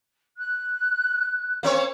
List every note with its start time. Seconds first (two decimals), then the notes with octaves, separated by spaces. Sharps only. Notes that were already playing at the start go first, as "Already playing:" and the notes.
0.37 F#6
1.63 A#3 C4 C#5